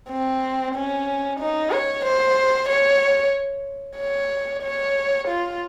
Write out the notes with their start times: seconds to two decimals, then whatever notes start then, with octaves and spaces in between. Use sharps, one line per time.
0.10 C4
0.75 C#4
1.40 D#4
1.72 C#5
2.05 C5
2.69 C#5
3.98 C#5
4.63 C#5
5.28 F4